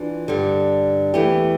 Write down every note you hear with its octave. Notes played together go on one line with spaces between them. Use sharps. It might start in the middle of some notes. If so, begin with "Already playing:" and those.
Already playing: E3 D4 F4
G2 D3 G3
E2 E3 A3 E4 G4